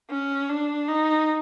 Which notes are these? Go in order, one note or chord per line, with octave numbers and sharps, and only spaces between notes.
C#4
D4
D#4